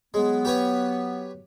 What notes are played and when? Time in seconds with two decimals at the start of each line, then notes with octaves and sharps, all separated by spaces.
0.14 F#3 G#3 B3
0.45 G4 B4 C#5